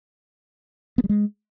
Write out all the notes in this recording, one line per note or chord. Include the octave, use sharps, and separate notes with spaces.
B3
G3
G#3